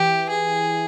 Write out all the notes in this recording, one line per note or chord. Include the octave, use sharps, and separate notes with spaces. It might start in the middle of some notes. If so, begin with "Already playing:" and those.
Already playing: E3 G4
G#4